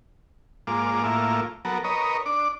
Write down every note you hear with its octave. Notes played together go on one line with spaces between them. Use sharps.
G#2 A#3 F4 D6
A2 A#3 E4 F4
F#3 B3 A4 A#4
A#4 B4 C#5 D#5
D4 D6